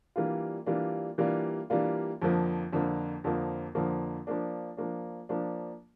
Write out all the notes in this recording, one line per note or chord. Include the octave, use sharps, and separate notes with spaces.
E3 G3 A#3 D4 F4
E3 G3 A#3 D4 F4
E3 G3 A#3 D4 F4
E3 G3 A#3 D4 F4
F2 D3 F3 A#3
F2 D3 F3 A#3
F2 D3 F3 A#3
F2 D3 F3 A#3
F3 A#3 D4
F3 A#3 D4
F3 A#3 D4